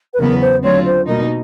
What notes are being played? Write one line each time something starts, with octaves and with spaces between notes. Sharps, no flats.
B4
E2 C#3 F#3 B3 A#4
C5
D3 F#3 A3 C4 F4 C#5
C5
B2 G3 A#3 D#4 A#4